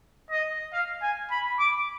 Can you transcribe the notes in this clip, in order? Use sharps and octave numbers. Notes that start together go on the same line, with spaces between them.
D#5
F5
G#5
B5
D6